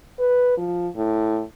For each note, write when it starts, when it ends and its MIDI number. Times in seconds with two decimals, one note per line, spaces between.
0.19 0.56 71
0.57 0.88 53
0.96 1.42 45